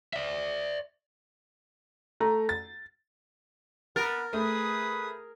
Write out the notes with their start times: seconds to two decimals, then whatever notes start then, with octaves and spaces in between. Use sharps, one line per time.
0.13 D5 E5
2.20 A3 A#5
2.49 A6
3.96 B3 A#4 A6
4.33 A3 G#4 B4 D#6